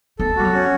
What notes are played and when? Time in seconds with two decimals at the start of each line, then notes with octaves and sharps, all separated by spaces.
0.19 B3 A4
0.36 G3 F#4
0.45 F#3
0.53 C#4